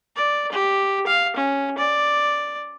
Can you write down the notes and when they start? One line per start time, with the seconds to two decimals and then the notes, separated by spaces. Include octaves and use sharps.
0.16 D5
0.52 G4
1.07 F5
1.36 C#4
1.78 D5